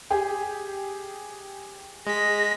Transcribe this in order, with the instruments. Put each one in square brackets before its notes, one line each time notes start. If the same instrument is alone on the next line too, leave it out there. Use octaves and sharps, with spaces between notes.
[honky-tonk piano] G4 G#4
[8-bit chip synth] G#3 B6 [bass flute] G#4 [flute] A#6